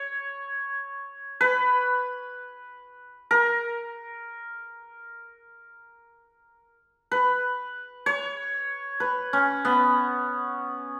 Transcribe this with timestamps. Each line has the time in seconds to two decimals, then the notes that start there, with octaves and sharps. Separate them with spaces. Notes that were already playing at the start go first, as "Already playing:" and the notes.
Already playing: C#5
1.41 B4
3.31 A#4
7.11 B4
8.06 C#5
9.00 B4
9.33 C#4
9.65 B3